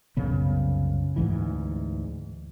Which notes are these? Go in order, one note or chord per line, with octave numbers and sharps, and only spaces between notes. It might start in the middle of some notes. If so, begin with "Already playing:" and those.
C2 F#2 C#3 B3
D2 G#2 E3